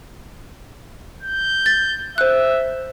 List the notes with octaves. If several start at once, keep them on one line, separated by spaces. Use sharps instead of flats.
G6
A6
C5 E5 F#6